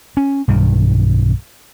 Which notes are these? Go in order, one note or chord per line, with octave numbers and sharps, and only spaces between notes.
C#4
B1 G2 D#3